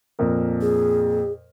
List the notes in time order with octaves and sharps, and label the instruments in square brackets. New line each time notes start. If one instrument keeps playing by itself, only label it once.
[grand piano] F2 A#2 A#4
[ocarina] G#4